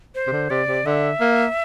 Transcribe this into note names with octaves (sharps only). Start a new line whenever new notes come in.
C5
C3
D3
C3 D5
C3
D3 E5
A#3